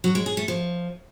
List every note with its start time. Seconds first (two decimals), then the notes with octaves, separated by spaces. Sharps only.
0.04 F#3
0.15 G#3
0.26 G#4
0.37 A3
0.48 F3